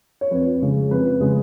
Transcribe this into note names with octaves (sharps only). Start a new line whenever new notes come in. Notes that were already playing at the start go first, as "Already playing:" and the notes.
C#5
F2 B4
C#3 G#3
F2 B4
C#3 G#3